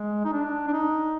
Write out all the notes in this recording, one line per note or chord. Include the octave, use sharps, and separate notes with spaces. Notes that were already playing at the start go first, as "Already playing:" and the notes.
Already playing: G#3
D#4
D4
D4
D#4